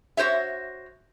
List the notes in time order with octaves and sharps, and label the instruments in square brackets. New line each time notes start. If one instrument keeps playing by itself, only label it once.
[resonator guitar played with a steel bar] F#4 C5 C#5 E5